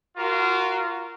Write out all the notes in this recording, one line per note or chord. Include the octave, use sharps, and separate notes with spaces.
F4 F#4 A#4